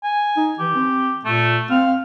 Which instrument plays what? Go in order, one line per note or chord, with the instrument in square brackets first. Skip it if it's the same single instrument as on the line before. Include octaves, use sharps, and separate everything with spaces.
[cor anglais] G#5
[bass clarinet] D#4
[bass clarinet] E3 [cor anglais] G4
[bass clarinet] C4
[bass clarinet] A#2 [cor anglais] A3
[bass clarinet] C4 [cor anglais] F5